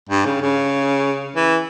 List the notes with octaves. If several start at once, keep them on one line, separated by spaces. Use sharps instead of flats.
G2
C#3
C#3
E3